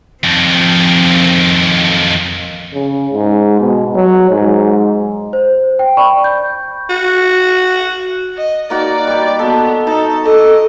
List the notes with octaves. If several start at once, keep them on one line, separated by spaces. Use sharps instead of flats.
F2 D#3 F3 C4
C#3
G#2
B2
F#3
G#2
C5
G5
D5 G5 B5 C#6
G6
F#4
D#5
A#3 D#4 F#4 D5
G3 G4
B3 F#4 A4
D#4 A4
A4 D#5 D6